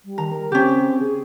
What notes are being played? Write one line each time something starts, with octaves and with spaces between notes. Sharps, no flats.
G3
D#3 A#5
A#4
C#3 C4 C#4 G4
G#4